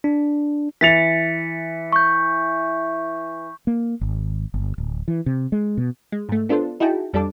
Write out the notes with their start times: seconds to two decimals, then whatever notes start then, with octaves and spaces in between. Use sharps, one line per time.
0.04 D4
0.81 E3 A6 B6 C#7 F7
1.93 C#6 G6
3.67 A#3
4.01 G#1
4.54 G1
4.78 D1
5.08 E3
5.26 C3
5.52 G#3
5.77 B2
6.12 G#3
6.29 G#2 A3
6.49 B3 D4 F4 A4 C5
6.80 D#4 E4 F#4 G#4 G5 A5
7.13 F2 G3 D4 A4 A5 D6